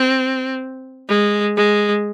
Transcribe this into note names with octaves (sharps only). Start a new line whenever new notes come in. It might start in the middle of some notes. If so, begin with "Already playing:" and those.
Already playing: C4
G#3
G#3